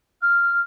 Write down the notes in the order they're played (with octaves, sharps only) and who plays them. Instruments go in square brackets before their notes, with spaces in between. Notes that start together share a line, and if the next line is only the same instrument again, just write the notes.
[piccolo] F6